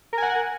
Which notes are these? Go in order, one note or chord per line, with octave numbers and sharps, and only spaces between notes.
A#4 F#5 G#5